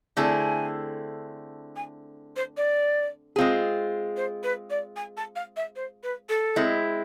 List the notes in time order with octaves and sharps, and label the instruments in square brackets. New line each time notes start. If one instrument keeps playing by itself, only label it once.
[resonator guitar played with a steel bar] D3 A3 C4 E4 G#4 [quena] G#5
[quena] G#5
C5
D5
[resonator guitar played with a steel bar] G#3 C4 F4 G#4
[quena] C5
B4
D5
G#5
A5
F5
E5
C5
B4
A4
[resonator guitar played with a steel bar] G#3 C4 E4